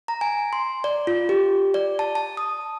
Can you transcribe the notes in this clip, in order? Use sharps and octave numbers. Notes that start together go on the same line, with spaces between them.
A#5
G#5
C6
D5
F4
G4
D5
A5
A5
D#6